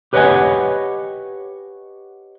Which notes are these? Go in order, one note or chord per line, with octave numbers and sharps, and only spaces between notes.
G4 B4 C#5 D#5 F#5 G#5